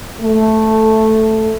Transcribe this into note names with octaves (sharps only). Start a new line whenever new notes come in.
A3